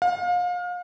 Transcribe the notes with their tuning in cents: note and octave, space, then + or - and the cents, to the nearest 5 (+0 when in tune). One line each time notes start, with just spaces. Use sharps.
F5 +35